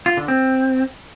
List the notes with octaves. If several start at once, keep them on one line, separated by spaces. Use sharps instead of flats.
F4
D3
C4